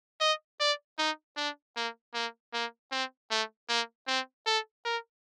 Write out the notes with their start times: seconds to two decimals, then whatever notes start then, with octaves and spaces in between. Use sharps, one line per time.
0.21 D#5
0.60 D5
0.99 D#4
1.37 D4
1.76 A#3
2.14 A#3
2.54 A#3
2.92 C4
3.31 A3
3.69 A#3
4.08 C4
4.47 A4
4.85 A#4